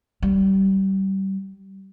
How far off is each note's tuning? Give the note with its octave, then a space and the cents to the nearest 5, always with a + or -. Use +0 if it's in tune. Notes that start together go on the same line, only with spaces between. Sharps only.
G3 -25